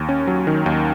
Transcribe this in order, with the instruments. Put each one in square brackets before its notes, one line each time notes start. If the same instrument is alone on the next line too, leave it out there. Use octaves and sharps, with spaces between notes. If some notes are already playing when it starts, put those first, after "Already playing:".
Already playing: [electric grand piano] D#2
C#4
F#3
D#3
D#2